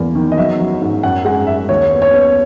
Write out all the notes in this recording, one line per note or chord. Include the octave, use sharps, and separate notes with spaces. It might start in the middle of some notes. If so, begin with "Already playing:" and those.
Already playing: E2 A#3
D#3
D#5
F#3 E5
F#3
G#2
F#2 F#5
G#3 F#5
F#2 E5
D#2 C#5
B3
C#5
B3